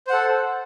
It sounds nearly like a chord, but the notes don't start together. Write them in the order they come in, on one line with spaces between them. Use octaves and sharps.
C5 F#5 A4